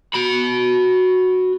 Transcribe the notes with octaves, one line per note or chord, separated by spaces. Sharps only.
F#4 B5